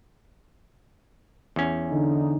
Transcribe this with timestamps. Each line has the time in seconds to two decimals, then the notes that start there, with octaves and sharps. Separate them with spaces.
1.56 E2 C#4
1.92 D3 D#4